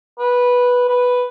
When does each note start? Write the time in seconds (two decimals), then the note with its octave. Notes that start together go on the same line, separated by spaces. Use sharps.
0.19 B4
0.89 B4